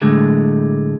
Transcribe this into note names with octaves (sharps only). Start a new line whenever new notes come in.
A2 D3 F#3 G#3 A3